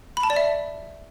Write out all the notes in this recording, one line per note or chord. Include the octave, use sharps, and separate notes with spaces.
B5
A5
D5
E5